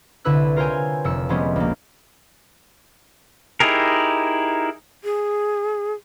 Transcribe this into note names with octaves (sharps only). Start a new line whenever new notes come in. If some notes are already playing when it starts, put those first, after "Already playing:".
C2 D3 E4 B4 E6 F#6
F4 A#4 C5 C#5 G5 G#5
F1 E6 C#7
C3 F3 G3 G#3 B3 C#4
A#1 A#3
D#4 E4 G4 G#4 A#4
G#4